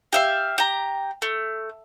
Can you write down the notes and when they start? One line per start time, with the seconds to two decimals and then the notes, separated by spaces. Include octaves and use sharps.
0.13 G4 E5 F5
0.58 G4 A#5
1.22 A3